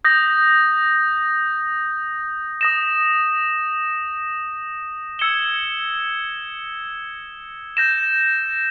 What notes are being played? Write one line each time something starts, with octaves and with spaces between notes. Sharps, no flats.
D#6 G6 A#6
D#6 A#6 E7
E6 G#6 C#7 E7 G7
G6 A#6 E7